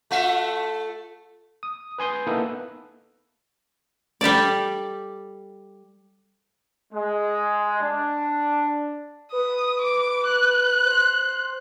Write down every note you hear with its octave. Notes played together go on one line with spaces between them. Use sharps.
A3 F4 E5
D#6
B4 G#5 C6 D#6 G6
A#3 B3 D#4 E4 A4 B4
G3 G4 A4 D5
G#3
D4
B4 D#6
D6
F#6
C5